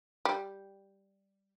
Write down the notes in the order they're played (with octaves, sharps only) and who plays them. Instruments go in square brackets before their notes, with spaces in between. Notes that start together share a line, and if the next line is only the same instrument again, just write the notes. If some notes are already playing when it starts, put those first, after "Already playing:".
[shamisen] G3